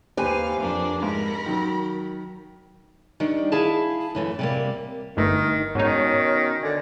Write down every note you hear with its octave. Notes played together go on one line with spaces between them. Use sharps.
D#2 G4 B4 C5 F5 G#5
F2 A#3 D4
G#2 A#4 B5
D#3 F#3
D#3 G3 D4
E4 G#4 F5 A5
F#2 E3 A3
C3 G3 A#3
G1 G2 D#3 A3 D#4
G#2 B2 D#3 C#4 D#4 C#5
D3 D5 G#5